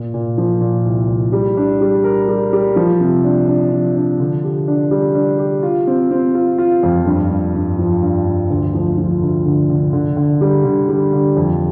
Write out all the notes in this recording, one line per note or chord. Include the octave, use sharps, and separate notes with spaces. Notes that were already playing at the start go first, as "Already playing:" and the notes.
Already playing: A#2
A#2
F3
A#2
C2
C2
G3
D4
G3
A#4
G3
G3
F3
C3
D4
D4
F3
D4
D3
G4
D4
G3
D4
G4
F4
C4
C4
F4
F4
F2
G2
G2
G2
F3
G2
G2
D2
F3
F3
D2
D3
D3
D3
D3
G3
D3
G3
D3
F2